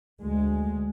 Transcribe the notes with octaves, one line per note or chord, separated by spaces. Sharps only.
D2 G#3